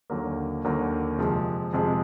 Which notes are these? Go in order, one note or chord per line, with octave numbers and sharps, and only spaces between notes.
D#2 D3 F#3 A#3
D#2 D3 F#3 A#3
F2 C3 F3 G#3
F2 C3 F3 G#3